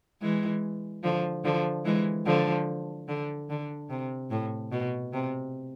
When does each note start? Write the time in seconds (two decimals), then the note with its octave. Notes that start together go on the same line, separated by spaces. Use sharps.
0.21 E3 G#3
1.03 D3 F3
1.44 D3 F3
1.85 E3 G#3
2.26 D3 F3
3.08 D3
3.50 D3
3.90 C3
4.31 A2
4.72 B2
5.13 C3